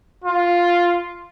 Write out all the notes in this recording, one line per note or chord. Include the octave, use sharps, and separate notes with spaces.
F4